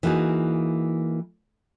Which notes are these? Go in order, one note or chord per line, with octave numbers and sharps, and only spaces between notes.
E3 A#3 D#4 F#4 G#4